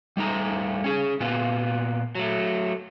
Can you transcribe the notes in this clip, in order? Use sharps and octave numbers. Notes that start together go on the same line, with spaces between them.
G3 A3 D#4 A#5
C#4 G#4
A#2 B3 F4
F#3 A3